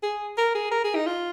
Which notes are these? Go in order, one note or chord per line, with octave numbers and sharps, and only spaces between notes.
G#4
A#4
G#4
A#4
G#4
D#4
F4